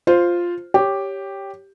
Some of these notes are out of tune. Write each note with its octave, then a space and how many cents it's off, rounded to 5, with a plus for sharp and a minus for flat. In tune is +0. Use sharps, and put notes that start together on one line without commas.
F4 +0 C5 +0
G4 +0 C#5 +5